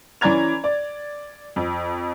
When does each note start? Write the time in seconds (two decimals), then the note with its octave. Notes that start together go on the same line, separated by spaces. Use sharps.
0.21 E3 C#4 D5 A#5 G#6 F7
0.64 D5
1.56 F2